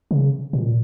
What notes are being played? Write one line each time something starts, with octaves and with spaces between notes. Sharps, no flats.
C#3
A#2